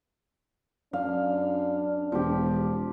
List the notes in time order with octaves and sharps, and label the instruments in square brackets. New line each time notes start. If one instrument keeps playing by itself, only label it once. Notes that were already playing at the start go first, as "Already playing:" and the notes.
[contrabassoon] F#2 [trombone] D4 [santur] F5
[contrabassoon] E1 [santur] F3 G4